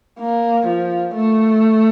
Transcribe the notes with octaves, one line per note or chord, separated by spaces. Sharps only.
A#3
F3
A3